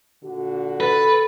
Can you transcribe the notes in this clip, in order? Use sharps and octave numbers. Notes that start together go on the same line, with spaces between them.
A#2 D3 F#4
A4 B4